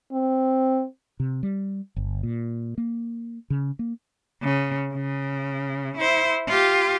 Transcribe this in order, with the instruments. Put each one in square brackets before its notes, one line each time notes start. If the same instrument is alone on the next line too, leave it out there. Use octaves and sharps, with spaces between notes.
[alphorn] C4
[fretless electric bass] C3
G3
G1
A#2
A#3
C#3
A#3
[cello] C#3
C#3
E4 C5
F4 G4